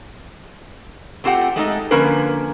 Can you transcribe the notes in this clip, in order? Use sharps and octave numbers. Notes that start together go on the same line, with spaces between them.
A3 C4 F4 G4 F#5 G5
G#3 A3 D#4 D#5
D3 F3 A#3 C#4 A#4 B4